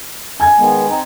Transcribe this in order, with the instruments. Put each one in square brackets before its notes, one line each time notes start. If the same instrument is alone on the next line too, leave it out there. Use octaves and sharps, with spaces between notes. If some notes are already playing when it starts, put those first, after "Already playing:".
[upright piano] G#5 G#6
[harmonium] D#3 G#3 B3
C4 D#4